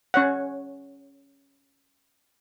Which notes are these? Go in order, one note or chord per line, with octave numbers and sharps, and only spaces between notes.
C#4 C#5 F#5